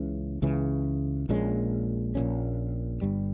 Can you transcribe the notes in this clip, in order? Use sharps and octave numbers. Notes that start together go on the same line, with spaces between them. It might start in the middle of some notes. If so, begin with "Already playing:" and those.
Already playing: C#2 C#3 E3
C#2 C#3 E3
A#1 A#2 G#3 C#4
A#1 A#2 G#3 C#4
G1 G2 G3